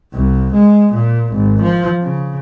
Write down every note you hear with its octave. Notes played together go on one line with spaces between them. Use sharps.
C2
G#3
A#2
G#1
F3
C#3